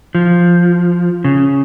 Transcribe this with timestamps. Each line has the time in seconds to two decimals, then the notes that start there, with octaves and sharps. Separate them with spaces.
0.15 F3
1.24 C#3